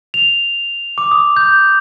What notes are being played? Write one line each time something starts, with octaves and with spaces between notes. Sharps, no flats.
F7
D6
D#6
G6